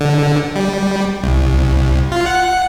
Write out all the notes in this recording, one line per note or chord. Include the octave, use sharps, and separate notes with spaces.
D3
G3
C2
F4
F#5